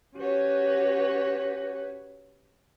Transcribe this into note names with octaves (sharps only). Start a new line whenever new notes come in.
C#4 F#4 G4 B4 C#5